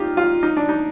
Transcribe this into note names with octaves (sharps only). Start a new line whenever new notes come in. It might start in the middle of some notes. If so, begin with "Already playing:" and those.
Already playing: D#4 F4 G4
F4
D#4
D4
D#4